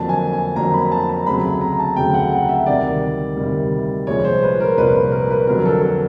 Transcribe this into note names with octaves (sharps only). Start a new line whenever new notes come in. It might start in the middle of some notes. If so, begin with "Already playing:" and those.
Already playing: F2 D3 F#3 A#3 A5
G#5
G#5
F2 D3 F#3 A#3 A#5
B5
A5
A#5
D2 C#3 F#3 A3 C4 B5
A#5
A5
D2 C#3 F#3 A3 C4 G5
F#5
F#5
E5
D2 C3 D#3 G3 D5
D2 C3 D#3 G3
C2 A#2 F3 G#3 C#5
C5
B4
A#4
C2 A#2 F3 G#3 B4
B4
A#4
B4
F2 D3 F#3 A#4
A4
A4